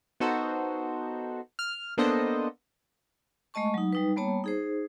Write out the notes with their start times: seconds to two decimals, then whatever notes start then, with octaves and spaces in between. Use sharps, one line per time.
0.20 B3 D#4 F#4 A4 C5
1.59 F6
1.97 A#3 B3 D4 A4 C5 D#5
3.54 G#3 A3 D#5 A5 C#6
3.74 F#3 D#4
3.93 G3 D#4 B4
4.17 G3 A#3 B3 C#5 A5 A#5
4.44 D#4 G#4 C5